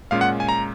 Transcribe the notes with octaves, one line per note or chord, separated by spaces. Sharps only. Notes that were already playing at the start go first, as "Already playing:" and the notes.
A#2 G#3 C#4 F4 F5
F#5
G#5
A#5